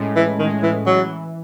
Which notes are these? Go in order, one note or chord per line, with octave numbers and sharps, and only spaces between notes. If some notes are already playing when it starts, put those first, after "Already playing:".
Already playing: A2 G#3 C#4
E3
D#3 G#3
E3
E3 F#3